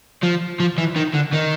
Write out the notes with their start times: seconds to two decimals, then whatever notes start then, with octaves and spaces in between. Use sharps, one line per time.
0.23 F3
0.60 F3
0.78 E3
0.96 D#3
1.14 D3
1.33 D#3